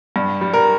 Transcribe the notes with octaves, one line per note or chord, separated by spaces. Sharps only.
G2
G3
A#4